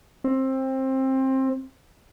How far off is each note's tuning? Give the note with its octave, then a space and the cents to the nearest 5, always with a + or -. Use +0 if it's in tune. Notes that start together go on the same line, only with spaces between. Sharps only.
C4 +20